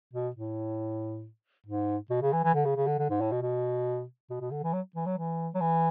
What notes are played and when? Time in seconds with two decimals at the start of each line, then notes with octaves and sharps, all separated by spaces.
0.13 B2
0.35 A2
1.66 G#2
2.10 B2
2.22 C#3
2.33 E3
2.44 E3
2.54 D3
2.65 C#3
2.77 C#3
2.87 D3
2.99 D3
3.10 G#2
3.21 A2
3.32 B2
3.42 B2
4.30 B2
4.40 B2
4.51 D3
4.63 E3
4.73 F#3
4.95 E3
5.06 F#3
5.18 E3
5.55 F#3
5.60 E3